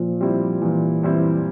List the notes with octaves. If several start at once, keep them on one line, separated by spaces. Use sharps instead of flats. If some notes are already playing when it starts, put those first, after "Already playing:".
Already playing: A#2 F3
G3 C4 E4
A#2 E3
G3 C4 E4